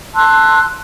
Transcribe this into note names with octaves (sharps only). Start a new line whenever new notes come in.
A5 C6 E6 F#6